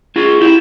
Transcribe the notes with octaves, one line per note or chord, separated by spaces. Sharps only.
F4 G#4
E4 G4